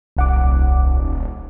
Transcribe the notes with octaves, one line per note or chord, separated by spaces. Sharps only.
D#1 C2 F#5 D6